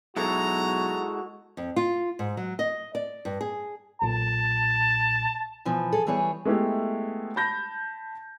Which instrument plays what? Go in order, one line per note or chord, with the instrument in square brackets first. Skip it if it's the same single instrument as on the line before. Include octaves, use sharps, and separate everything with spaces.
[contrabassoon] B1 [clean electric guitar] G#3 E4 A4 [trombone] F#4 [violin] A#5
[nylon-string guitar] F2
F4
G#2
F#3
D#5
D5
G2
G#4
[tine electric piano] B1 A#2 [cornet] A5
[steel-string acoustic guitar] B2 E3 F3
G#4 A4
E3 G3 B3 G#4 C#5
[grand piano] G#3 A3 B3 E4 G4
A5 B5 G6 A#6